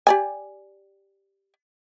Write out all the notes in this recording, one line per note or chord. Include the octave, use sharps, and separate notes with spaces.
G4 D5 G#5